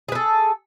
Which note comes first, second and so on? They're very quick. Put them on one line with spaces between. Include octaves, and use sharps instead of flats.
G#4 B4 A4